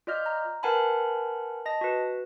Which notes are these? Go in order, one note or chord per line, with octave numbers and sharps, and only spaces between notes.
F4 D5 D#5 F6 G6
A#5
A#4 B4 F#5 G#5 A5 B5
D#5 A5 A#6
F#4 B4